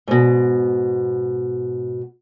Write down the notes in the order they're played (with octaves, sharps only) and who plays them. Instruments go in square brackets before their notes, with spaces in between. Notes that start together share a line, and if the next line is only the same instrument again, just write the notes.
[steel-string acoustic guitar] G#2 B2